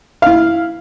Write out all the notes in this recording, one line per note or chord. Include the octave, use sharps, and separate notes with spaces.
E4 F5